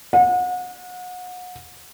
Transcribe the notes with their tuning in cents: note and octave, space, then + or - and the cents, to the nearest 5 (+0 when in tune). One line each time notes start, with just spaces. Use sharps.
F#5 -35